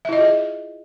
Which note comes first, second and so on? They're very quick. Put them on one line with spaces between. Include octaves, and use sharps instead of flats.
E5 E4 D#5 F4 G#4